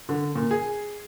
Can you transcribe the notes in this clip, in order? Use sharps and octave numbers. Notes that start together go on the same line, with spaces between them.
D3
A#2
G#4